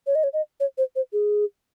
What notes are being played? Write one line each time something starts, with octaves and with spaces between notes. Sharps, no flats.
C#5
D#5
C#5
D#5
C#5
C5
C5
G#4